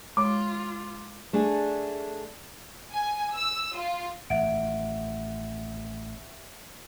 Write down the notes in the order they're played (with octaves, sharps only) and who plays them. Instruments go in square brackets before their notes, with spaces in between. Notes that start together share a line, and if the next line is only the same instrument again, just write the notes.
[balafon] G#3 C#5 [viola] F4 [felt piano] D6
[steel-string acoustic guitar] A3 D4 G#4
[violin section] G#5
E6
F4
[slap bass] A1 D#3 [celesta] E5 F#5 D7